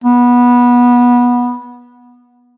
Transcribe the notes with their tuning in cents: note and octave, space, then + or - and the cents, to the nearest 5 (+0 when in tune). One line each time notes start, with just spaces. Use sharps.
B3 -20